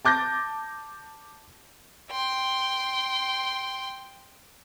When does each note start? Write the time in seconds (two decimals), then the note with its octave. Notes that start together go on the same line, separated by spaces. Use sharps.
0.05 A5 D6 G6 A6 A#6
2.11 G5 C6